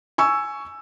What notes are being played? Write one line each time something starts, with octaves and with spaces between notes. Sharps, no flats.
G#5 C#6 E6